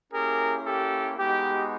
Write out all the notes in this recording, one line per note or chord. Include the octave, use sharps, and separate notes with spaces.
A#3 C#4 E4 G4 G#4 A#4
G4 A4
G#3 B3 D#4 F#4 G4